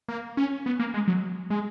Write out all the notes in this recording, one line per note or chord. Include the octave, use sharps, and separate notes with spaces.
A#3
C#4
B3
A#3
G#3
F#3
G#3